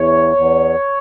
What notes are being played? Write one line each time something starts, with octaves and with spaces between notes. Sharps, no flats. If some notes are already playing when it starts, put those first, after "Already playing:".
Already playing: E2 C#5
E2